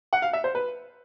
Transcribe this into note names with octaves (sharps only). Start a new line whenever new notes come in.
F#5
F5
E5
C5
B4